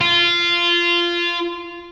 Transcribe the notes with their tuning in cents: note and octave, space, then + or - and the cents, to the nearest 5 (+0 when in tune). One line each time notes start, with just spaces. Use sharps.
F4 -15